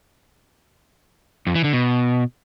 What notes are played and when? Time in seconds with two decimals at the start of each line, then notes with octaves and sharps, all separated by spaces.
1.47 F2
1.55 E3
1.64 D3
1.73 B2